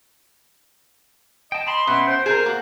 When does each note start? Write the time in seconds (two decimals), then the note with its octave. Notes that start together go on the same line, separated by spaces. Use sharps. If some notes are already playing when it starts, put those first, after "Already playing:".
1.52 D#5 G5 A5
1.67 A5 B5 C6
1.87 B2 C#4 B4 E5 F#5
2.07 C5 G5
2.26 G#4 A#4 A5
2.46 A#3 F#4